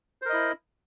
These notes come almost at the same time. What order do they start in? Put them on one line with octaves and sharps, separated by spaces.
C5 A#4 D#5 E4